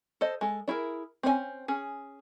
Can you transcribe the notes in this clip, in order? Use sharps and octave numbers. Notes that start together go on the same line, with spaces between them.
A4 C5 D#5
G#3 A4
D4 E4 G#4 A#4
C4 C#4 D#4 G#5
C#4 G#4